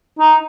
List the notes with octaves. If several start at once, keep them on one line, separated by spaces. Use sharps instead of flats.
D#4